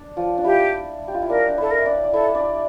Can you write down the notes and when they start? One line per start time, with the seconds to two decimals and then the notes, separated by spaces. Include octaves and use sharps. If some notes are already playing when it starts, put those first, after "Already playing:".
Already playing: D4
0.17 F3 F4
0.38 D4
0.44 E4 G4
1.08 G4
1.15 F4
1.22 E4
1.29 D4 A#4
1.49 D4
1.58 E4 A4
1.71 A#4
1.78 E5
1.86 D4 D5
2.04 D5
2.13 E4 A4 E5
2.35 D4 D5